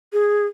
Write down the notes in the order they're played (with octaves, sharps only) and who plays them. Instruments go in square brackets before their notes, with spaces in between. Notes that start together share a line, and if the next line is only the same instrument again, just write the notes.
[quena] G#4